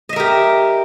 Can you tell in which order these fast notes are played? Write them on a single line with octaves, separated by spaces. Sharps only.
D#5 E5 A#4 G4